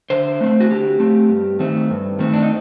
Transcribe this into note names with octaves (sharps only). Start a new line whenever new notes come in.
D3 C5
A3 C4
F#4
D3 G4
A3 C4
G2
D#3 A3 C4
G2
D#3 A3 C4
D4
D#4